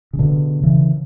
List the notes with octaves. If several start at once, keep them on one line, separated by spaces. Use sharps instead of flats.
C#3
B2 D3
C#3 E3